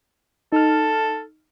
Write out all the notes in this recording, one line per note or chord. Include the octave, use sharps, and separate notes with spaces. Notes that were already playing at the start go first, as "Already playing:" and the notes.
D#4 A4 F6